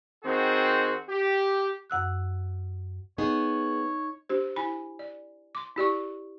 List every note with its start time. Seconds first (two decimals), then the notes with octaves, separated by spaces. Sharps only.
0.24 D#3 C4 F#4 G#4
1.09 G4
1.90 F#2 F#5 E6 F#6
3.18 B3 D#4 G#4 C#5
4.29 D4 G4 C5
4.56 E4 G#5 B5
4.99 D5
5.55 C6 D6
5.76 E4 G4 D5 C#6